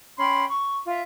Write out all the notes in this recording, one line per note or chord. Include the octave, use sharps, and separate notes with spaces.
C#4 G5 B5 C6
C#6
F4 E5